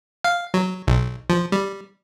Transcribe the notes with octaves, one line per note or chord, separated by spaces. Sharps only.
F5
F#3
B1
F3
G3